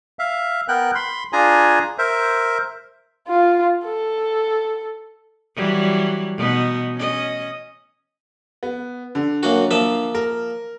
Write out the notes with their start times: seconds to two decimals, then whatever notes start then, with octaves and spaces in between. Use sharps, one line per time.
0.19 E5 F5
0.68 B3 A#4 G5 F#6
0.95 B5 C6
1.33 D4 F4 G#4 G#5 A#5
1.98 A#4 C5 E5
3.28 F4
3.84 A4
5.56 E3 F#3 G3
6.37 B2 B3 D#4
6.95 C#4 D#5
8.63 B3
9.15 D3
9.43 F#2 A#3 F#4
9.71 F3 A#3 E5
10.15 A#4